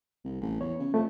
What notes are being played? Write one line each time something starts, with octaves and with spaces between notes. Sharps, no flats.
C2
A1
E2 C#5
C#3
F2 A3